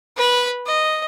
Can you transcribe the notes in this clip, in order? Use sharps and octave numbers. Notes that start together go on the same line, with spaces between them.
B4 B5
D#5